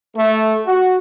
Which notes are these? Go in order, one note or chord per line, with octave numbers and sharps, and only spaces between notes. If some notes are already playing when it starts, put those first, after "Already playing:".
A3
F#4